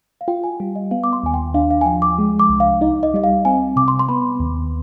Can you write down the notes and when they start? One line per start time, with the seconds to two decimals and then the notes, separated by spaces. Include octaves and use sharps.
0.21 F5
0.28 F4 G5
0.44 G#5
0.60 G3
0.75 D#5
0.91 B3 F5
1.04 D6
1.13 C6
1.23 D#2 G#5
1.34 G5
1.54 D4 F5
1.71 F5
1.81 G#5
1.86 F3 G5
2.02 D6
2.19 G#3
2.40 D6
2.49 C2
2.60 F5
2.81 D#4 D#5
3.03 D#5
3.14 G3 D#5
3.24 F5
3.45 C4 G#5
3.76 C3 D6
3.88 C6
3.99 C6
4.09 B3 B5
4.40 D#2